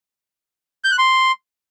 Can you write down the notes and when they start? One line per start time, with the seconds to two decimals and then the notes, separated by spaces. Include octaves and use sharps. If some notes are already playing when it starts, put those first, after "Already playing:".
0.84 G6
0.91 F#6
0.98 C6